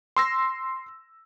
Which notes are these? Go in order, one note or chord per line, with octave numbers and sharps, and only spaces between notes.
C6 E6 A#6